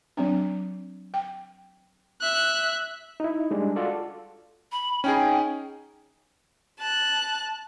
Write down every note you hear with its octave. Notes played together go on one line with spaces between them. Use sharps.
F#3 C4 D4
G5
E5 F#6
D#4 E4
G3 G#3 D4
F4 F#4 A4 D5
B5
C#4 D#4 G#4 G5
A5 F#6